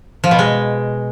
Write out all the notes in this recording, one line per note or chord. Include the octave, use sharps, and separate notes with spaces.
F3
B2
G#3